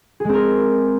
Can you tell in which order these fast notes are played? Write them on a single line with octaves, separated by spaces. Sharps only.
G#4 G#3 C4 A#4